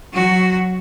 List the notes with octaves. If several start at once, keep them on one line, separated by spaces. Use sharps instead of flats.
F#3 F#4